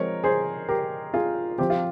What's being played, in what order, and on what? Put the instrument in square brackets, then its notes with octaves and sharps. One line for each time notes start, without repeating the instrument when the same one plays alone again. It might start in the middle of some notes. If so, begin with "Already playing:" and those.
Already playing: [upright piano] F3 G#3 C4 A#4 C#5
G#4 C5
G4 A#4
F4 G#4
F3 C4 G4
F4